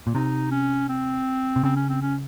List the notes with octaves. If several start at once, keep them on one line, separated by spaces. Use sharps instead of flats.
A#2
C3 D#4
C#4
C4
C3
C#3 C4
C#4
C4
C#4